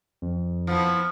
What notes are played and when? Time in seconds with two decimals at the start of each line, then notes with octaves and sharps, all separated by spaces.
0.22 F2
0.67 F3 B3 E4